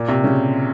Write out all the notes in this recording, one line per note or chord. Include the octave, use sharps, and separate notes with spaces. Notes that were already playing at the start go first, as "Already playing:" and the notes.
Already playing: A#2
C3
C#3